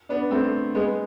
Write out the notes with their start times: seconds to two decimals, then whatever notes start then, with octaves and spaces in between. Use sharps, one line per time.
0.09 B3 D4
0.31 A3 C4
0.75 G#3 B3